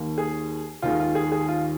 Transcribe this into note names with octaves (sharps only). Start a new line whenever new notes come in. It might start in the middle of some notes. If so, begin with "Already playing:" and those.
Already playing: D#2 D#3 A#3
G#4
D#2 D#3 G#3 F4
F4
G#4
G#4
F4